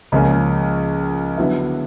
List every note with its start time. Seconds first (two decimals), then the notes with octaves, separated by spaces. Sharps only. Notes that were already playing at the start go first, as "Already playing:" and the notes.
0.12 C#2 C#3 F3 A#3 C#4
1.38 D3 F#3 B3 E4